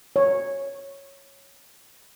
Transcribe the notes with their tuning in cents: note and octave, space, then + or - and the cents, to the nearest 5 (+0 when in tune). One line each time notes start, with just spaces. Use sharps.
C#5 -5